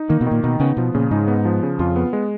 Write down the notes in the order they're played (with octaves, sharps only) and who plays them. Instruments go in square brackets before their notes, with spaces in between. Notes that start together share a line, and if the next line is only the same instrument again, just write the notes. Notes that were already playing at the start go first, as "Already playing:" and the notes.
Already playing: [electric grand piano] D#4
[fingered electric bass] D#3 [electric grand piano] A#3
[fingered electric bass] B2
[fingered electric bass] A#2 [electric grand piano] D#3
[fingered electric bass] B2 [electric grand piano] D#4
[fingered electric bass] C#3 [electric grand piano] B3
[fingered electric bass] B2 [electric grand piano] F3
[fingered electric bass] A#2 [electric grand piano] C#3
[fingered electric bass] G#2 [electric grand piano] D#4
[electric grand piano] B3
F3
C#3
[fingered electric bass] F2 [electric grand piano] F4
[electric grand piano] B3
G#3